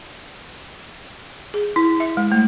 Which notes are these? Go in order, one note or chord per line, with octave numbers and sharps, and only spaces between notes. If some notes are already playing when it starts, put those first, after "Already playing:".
G#4
E4
E5
G#3
A3